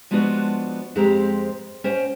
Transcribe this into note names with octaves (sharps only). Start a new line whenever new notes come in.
F3 G#3 B3 D4 F4 F#4
F2 G#3 C4 G4 C5 A#5
C#4 C5 D#5 G5